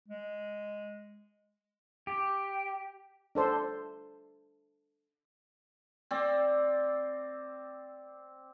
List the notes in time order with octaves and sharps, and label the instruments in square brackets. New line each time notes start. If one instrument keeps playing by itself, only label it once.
[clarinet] G#3
[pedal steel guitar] G4
[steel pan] D4 A4 C5
[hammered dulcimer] C4 D5